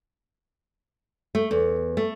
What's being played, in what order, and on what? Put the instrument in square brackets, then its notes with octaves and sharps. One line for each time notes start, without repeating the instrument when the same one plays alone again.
[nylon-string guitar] A3
E2
A3